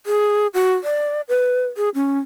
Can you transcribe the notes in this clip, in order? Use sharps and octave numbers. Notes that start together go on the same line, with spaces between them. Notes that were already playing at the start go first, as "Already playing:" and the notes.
G#4
F#4
D5
B4
G#4
C#4